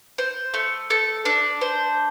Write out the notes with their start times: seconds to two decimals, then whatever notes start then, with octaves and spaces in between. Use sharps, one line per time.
0.18 C5
0.54 A3
0.90 A4
1.25 D4
1.61 C5